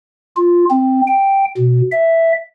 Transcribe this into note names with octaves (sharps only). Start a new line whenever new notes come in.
F4
C4
G5
B2
E5